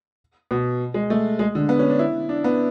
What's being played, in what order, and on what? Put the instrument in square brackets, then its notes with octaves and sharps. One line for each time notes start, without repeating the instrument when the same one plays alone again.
[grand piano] B2
G#3
A3
G#3
D3
B3
C#4
D4
E4
D4
B3